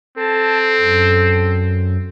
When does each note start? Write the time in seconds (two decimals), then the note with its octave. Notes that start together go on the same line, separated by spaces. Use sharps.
0.18 C4 A4 A5
0.80 F#2